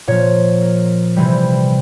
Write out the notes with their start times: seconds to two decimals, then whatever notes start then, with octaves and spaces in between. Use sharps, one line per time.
0.07 A#2 F3 C#5
0.62 A#4
1.16 C3 E3 G3